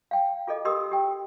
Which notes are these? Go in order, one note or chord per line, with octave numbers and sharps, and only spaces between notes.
F5 G5
F4 G#4 A4 D#5
G4 A#4 D#5 C6 D#6 E6
G4 G5